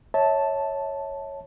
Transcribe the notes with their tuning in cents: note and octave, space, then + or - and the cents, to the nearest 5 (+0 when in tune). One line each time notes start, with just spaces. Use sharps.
C#5 +0 E5 -35 A5 +0